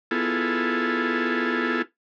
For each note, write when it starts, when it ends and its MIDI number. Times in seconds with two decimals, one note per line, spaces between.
0.11 1.82 59
0.11 1.82 64
0.11 1.82 65
0.11 1.82 68
0.11 1.82 69